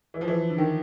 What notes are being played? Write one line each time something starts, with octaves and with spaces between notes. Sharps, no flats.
E3
F3
E3
D3
D#3